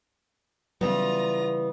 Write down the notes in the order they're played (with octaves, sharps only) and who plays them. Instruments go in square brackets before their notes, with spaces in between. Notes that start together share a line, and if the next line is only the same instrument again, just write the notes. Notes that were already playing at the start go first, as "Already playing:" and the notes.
[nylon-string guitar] C#3 E3 G3 [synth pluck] F#3 [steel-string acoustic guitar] B3 [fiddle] F4 A#5